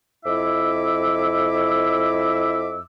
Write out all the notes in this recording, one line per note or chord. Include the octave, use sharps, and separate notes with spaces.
F2 E4 D#5 E5 D6 E6